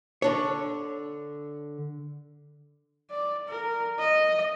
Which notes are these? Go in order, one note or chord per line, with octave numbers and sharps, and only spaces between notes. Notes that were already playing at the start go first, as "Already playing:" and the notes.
D3 D4 C#5
D5
A#4
D#5